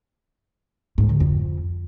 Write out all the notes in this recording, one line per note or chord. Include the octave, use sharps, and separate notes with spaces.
G#2
D3
F2